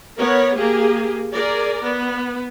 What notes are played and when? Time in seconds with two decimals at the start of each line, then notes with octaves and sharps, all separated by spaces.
0.18 B3 A#4 C#5
0.55 A#3 G4 G#4
1.33 G#4 A#4 D5
1.83 B3